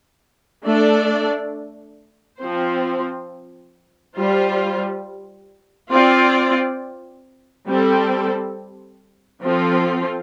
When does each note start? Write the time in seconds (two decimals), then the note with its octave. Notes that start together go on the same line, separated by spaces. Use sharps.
0.64 A3 D4 A4 D5
2.40 F3 C4 F4 C5
4.15 G3 F4 C5
5.91 C4 F4 D5
7.66 G3 C4 A4
9.42 F3 C4 F4 A4